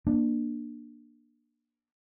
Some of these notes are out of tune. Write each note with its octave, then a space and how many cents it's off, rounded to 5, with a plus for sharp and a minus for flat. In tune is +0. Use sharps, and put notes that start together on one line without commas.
A#3 +20 D4 +20